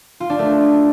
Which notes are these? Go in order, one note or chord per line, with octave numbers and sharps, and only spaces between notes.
F4
D4
A3